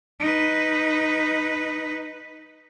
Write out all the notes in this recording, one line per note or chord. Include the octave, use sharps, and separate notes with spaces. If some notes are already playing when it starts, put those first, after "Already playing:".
D#4 B4